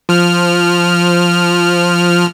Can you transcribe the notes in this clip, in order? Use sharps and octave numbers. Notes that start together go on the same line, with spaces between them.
F3 F6